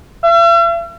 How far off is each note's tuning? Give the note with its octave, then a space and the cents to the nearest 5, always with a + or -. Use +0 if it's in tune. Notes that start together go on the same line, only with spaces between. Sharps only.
E5 +45